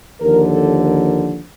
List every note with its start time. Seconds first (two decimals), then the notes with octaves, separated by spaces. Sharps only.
0.21 D#2 D3 F3 A#4
0.52 A4
0.82 A#4